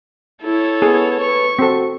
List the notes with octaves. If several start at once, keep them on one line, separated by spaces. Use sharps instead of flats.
E4 A4 C#5
B3 G#4
B4 C#6
C4 F#4 A4